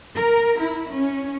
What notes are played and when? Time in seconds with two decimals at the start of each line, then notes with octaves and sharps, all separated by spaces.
0.16 A#4
0.57 E4
0.93 C#4